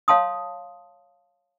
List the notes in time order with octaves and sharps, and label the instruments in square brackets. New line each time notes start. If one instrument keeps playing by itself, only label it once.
[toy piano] C#5 F5 A5 C6 D#6